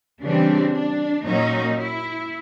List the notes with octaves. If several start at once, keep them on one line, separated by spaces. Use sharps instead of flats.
C#3 E3 G3 C4 D4
D4
A#2 F#3 A#3 C#4 D#4
E4